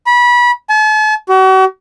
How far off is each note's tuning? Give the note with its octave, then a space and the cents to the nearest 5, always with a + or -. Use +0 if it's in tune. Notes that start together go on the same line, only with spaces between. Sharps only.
B5 -25
A5 -45
F#4 +40